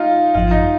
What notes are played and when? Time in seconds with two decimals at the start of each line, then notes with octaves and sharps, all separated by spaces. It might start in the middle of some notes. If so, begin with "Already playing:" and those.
Already playing: D#4 F4
0.35 G#1 F#2 F3 F4
0.51 D#4